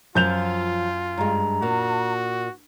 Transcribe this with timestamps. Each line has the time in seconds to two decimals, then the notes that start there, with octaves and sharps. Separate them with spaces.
0.15 F#2 F3 F4 G6 F7
1.18 G2 G#3 A#5
1.62 A#2 F#4